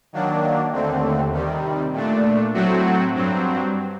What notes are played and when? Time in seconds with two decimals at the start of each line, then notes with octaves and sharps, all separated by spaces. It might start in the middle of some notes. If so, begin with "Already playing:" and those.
0.13 D#3 F#3 A#3 D4
0.72 D#2 D3 A3 C4
1.32 C3 D#3 G3
1.93 A#2 A3 D4
2.54 A2 F#3 A3 C4 F#4
3.14 G2 F#3 C4